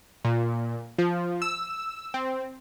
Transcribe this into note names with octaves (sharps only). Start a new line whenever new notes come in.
A#2
F3
E6
C4